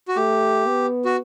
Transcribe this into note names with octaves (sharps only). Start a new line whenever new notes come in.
F#4
A3 G4
B3
F#4